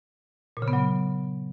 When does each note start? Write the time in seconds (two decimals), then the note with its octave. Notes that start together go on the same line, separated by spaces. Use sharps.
0.57 A#2
0.62 C#3
0.68 B3
0.73 F#3